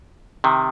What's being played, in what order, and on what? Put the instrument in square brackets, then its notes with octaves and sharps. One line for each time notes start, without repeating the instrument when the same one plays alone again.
[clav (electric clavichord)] C3 D#3